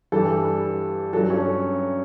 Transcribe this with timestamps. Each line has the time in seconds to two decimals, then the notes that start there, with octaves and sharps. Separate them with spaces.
0.12 G2 E3 G3 A4
1.13 G2 F#3 A4
1.30 C#4